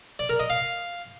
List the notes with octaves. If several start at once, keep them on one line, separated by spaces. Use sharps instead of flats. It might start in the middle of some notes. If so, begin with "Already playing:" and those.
D5
A#4
D#5
F5